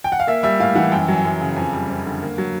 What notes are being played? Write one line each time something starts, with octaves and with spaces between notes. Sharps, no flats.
G5
F#5
F5
A#3 E5
G3 E5
A2 F5
E3 F#5
F#2 G5
F#3 G#5
F#2
C#3
F2 G#5
G3
F2
D3
A#3
F#3